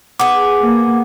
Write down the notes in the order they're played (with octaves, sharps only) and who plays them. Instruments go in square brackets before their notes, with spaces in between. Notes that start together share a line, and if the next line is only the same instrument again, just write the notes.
[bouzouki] B3 G#4 [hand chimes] D6
[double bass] A#3